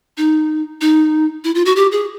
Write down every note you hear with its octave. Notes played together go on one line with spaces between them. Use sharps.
D#4
D#4
E4
F4
F#4
G4
G#4